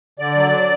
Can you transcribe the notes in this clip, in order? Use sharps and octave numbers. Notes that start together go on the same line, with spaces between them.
D3 D5
F#3